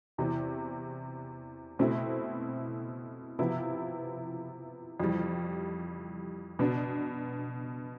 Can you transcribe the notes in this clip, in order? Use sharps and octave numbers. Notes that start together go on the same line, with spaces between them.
E2 C3 E3
B2 A3 C4 E4
C3 F3 B3 E4
F2 E3 G3
B2 B3 D4